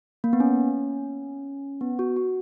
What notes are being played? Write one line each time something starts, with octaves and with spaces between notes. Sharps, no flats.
A#3
B3
C#4
B3
F#4
F#4